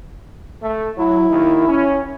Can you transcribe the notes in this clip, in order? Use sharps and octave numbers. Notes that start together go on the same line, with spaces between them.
A3
F#3 E4
D#2 D#3
C#4